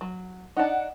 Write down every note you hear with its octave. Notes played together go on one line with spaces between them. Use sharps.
F#3
D4 D#4 F#5